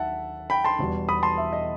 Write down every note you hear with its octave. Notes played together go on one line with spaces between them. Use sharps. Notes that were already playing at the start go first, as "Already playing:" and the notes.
Already playing: D#2 D#3 F#3 E5 F#5 A5
G5 B5
A5 C6
E1 E2 B2 G3
B5 D#6
A5 C6
E5
D#5